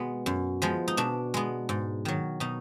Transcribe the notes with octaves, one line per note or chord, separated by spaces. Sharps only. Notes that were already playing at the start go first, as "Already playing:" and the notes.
Already playing: B2 G#3 B3
F#2
F3 G#3 B3
D#4
B2 D4
G#3 B3
G#2
D#3 F#3
B2 D#4